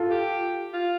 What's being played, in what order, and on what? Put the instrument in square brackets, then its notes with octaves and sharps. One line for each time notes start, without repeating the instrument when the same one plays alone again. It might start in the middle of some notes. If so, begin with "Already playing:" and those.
Already playing: [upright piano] F4 A4
[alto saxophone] G4
F4